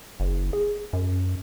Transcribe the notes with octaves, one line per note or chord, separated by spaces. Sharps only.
F#1
G#4
F#2